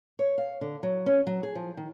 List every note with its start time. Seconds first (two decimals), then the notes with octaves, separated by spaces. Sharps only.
0.19 C#5
0.38 F5
0.61 D3
0.83 F#3
1.06 C#4
1.27 F#3
1.43 G#4
1.55 F3
1.77 D#3